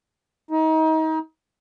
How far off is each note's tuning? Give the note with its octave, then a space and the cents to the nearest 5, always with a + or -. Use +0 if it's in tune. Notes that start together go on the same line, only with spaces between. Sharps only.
D#4 +30